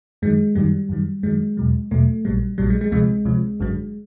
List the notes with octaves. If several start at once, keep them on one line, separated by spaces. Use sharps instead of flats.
F#2 D#3 F#3 G#3
F#2 D#3 F#3 G3
F#2 D#3 F#3
F#2 D#3 F#3 G#3
E2 B2 F#3
E2 B2 F#3 A3
A#1 A#2 F#3 G3
A#1 A#2 F#3 G3
G#3
G#3
D2 C3 F3 G#3
D2 C3 F3
G#1 F#2 D3 F#3